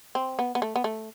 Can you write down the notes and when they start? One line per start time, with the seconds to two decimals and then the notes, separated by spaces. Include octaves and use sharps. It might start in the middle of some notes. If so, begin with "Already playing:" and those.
0.15 C4
0.39 B3
0.55 B3
0.62 A3
0.76 B3
0.84 A3